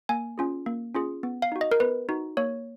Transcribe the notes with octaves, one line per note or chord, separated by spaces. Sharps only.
A#3 G#5
C#4 F4 G#4
A#3
C#4 F4 G#4
B3
F5
D#4 F#4
D#5
A#4
B3 B4
D#4 F#4
A#3 C#5